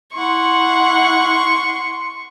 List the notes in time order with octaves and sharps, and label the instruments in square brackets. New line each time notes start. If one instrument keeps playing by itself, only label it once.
[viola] E4 F#5 [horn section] C6 [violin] C#6